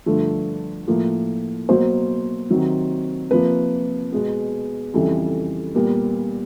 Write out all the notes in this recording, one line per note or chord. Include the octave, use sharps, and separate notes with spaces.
G2 D3 F3 A3
A2 F3 A#3
B2 F#3 A#3 C5
C3 D#3 F#3
C3 F3 A#3 B4
B2 G#3 B3
F2 C#3 E3 G3 A4
A#2 G3 B3 A#4